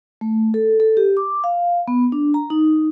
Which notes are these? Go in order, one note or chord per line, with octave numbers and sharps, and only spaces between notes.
A3
A4
A4
G4
D6
F5
B3
D4
A#5
D#4